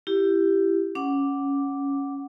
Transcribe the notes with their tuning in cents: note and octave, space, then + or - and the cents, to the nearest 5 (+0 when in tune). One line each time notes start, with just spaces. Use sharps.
E4 +20 G4 +0
C#4 +0 F#5 -5 D6 +0